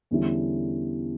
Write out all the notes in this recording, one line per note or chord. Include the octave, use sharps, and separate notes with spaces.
E2 D3 G3 C#4 E4